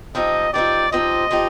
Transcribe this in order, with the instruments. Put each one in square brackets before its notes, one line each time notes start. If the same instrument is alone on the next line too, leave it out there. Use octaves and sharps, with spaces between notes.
[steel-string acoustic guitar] F3 C4 D#4 G4 [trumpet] D#5
[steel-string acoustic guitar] F3 C4 D#4 G4 [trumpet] D5
[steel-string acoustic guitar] F3 C4 D#4 G4 [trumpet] D#5
[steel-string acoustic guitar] F3 C4 D#4 G4